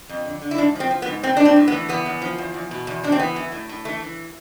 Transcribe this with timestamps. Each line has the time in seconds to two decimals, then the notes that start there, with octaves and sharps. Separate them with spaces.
0.09 F2
0.25 D3
0.42 D3
0.51 E4
0.58 G#2 D4
0.75 F3 C4
0.91 F3
1.02 B3
1.07 G#2
1.23 A2 C4
1.37 A2 D4
1.45 C4
1.56 A2
1.68 B3
1.72 E3
1.89 E2 B3
2.06 E2
2.22 F3
2.38 E2
2.54 E2
2.71 B2
2.87 E2
3.04 E2 D4
3.12 C4
3.19 E3 B3
3.36 E3
3.52 A2
3.69 A2
3.85 E3 A3
4.02 E3